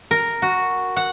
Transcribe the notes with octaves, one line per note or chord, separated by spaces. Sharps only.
A#4
F#4
F#5